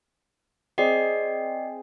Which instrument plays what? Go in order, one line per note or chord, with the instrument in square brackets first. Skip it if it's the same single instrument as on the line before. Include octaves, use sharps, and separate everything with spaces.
[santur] C4 G#4 [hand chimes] D5 D#5 C7